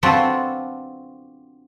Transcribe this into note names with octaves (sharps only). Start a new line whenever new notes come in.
C4 D4 F4 F#4 A4 B4